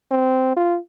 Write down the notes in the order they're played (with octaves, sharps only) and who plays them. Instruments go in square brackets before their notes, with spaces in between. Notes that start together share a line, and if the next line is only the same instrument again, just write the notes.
[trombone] C4
F4